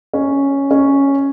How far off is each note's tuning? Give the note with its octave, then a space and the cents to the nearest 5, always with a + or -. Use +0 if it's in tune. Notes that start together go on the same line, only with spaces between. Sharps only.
C#4 +0
C#4 +0